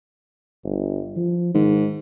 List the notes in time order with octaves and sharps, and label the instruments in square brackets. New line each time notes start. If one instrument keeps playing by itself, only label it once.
[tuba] G1
F3
[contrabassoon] G#2 [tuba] D#3